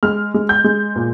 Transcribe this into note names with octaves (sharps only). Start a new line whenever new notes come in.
G#3 F6
G#3
G6
G#3
A#2